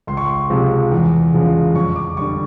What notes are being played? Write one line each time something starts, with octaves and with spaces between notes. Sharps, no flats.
C#2 C6
C#6
C6
C3 F3 G#3
E2
C#3 F3 G#3
F2 C#6
D6
D3 G3 C#6